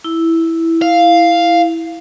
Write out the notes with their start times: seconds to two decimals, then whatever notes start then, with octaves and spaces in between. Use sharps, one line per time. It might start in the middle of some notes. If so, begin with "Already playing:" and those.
0.04 E4
0.82 F5